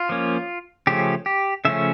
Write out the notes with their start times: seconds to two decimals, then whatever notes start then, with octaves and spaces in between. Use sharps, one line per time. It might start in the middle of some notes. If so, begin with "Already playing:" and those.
Already playing: F4
0.09 F3 A#3 C#4
0.87 C#3 F3 A3 C#4 G4
1.26 G4
1.65 C#3 F3 A3 C#4 E5